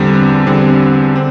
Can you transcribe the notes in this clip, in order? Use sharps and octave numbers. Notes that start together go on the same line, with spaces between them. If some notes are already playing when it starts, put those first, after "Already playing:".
Already playing: E2 D3 G3 C4
E2 D3 G3 C4
D3 C4